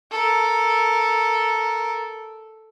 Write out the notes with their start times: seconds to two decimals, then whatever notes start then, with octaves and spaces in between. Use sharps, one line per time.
0.11 A4 A#4